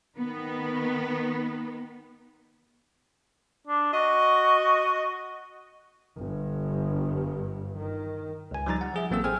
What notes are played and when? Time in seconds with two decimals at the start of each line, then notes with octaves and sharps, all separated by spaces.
0.17 D#3 B3
3.67 D4
3.94 F#4 D#5
6.17 G1 G2
7.78 D#3
8.51 C#2 G#5
8.66 F3 G3 D#4 A#5 A6
8.81 F#5
8.94 F3 G#4 E5
9.10 A1 F#3 A#3 C4 A4 E6
9.24 G#4 C5 G5 G#5 F6